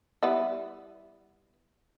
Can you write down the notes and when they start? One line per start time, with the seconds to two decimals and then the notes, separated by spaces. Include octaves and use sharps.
0.23 G3 B3 E4